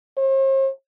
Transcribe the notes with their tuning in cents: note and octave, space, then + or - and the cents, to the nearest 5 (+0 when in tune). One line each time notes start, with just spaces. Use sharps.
C5 +45